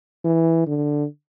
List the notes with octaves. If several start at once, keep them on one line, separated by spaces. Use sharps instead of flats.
E3
D3